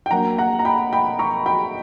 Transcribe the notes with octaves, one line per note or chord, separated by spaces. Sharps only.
G5
F#3 A#3 D4 F#5 A#5
F#5 A#5
A#5
G5 B5
G5 B5
A#5 C#6
G5 B5